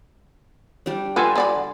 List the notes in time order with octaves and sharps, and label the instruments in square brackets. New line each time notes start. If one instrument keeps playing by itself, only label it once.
[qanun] G3 D4
[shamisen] F4 A4 B4 [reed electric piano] F#5 G#5 C6
[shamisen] D3 D5 B5